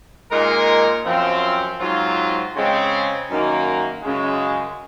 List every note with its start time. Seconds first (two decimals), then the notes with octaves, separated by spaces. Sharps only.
0.31 A#2 G#3 D#4 A#4
1.06 F#2 F3 C4
1.80 G#2 F#3 C4 F4
2.55 C#3 G#3 C4
3.29 F#2 D#3 A#3
4.03 F#2 C#3 G#3